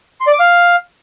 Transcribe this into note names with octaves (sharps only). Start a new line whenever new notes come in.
C6
D5
D6
F5